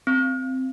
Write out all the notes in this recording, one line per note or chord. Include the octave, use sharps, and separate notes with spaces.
C4